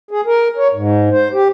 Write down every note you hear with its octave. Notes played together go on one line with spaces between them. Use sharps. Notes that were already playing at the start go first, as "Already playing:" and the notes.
G#4
A#4
C#5
G#2
C5
G4